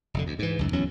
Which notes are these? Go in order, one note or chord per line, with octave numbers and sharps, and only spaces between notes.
F1 D3
D2
G#2 E3
C#2 F#2
D1 E2 F#3 C#4